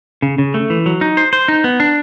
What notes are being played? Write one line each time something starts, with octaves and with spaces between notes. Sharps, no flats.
C#3
C#3
A3
E3
F#3
D#4
C5
C5
D#4
B3
D4